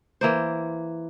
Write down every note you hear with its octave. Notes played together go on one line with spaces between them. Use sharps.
E3 A#3 C5